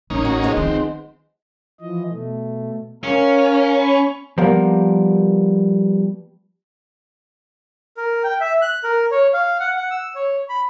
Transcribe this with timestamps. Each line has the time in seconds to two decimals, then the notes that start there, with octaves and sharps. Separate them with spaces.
0.10 A1 A#3 C#4 D#4
0.25 F#4
0.43 F3 G#3 B3
0.57 D#3 C4
1.81 E3 F3 D#5
2.10 B2 A3
3.04 C#4 A#4 F5
3.78 B5 C#6
4.38 F3 G3 A#3 B3 G4 A#4
7.97 A#4
8.24 G5
8.40 E5
8.62 F#6
8.84 A#4
9.11 C#5
9.33 F5
9.60 F#5
9.76 F#5
9.91 E6
10.15 C#5
10.49 B5